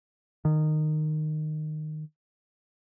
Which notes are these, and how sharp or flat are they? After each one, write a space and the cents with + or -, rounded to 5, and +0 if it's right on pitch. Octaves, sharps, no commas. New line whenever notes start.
D#3 -15